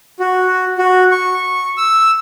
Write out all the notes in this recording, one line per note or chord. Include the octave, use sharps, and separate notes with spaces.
F#4
F#4
C#6
E6